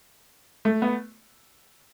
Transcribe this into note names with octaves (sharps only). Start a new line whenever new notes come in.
A3
B3